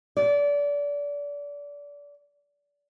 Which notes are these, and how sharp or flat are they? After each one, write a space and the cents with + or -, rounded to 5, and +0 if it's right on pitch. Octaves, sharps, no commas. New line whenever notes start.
D5 -30